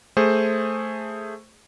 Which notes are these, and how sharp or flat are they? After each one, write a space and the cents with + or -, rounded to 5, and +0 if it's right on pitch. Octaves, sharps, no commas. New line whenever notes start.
A3 +0 G#4 +0 C5 +5